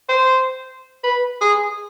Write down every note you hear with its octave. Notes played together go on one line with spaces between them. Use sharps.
C5
B4
G#4